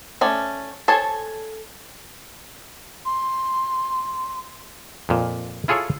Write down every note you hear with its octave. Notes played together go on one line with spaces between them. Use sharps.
A3 C#4 D5
A4 C5 C#5 G#5 A5
C6
F2 A#2
E4 F4 G#4 A4 C#5